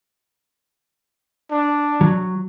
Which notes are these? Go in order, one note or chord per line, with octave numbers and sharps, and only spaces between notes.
D4
F#3